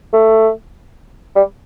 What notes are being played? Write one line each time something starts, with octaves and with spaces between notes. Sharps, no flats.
A3
G3